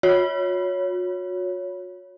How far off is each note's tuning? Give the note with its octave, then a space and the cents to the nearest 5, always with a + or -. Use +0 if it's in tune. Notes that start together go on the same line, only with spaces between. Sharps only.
F#4 -40 C#5 +10